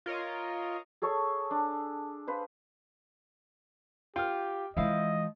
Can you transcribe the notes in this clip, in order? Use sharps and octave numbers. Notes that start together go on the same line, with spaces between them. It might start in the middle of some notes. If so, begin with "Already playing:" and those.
F4 A#4 C#5 D#5
G#4 A4 C#5 C#6
D4
B4 C5 F5
F4 G4 G5 F6
E3 F3 G#3 E4 C5 D#5 F5